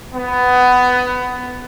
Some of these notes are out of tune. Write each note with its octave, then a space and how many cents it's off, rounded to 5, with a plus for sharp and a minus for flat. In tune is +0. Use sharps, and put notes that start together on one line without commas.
B3 +15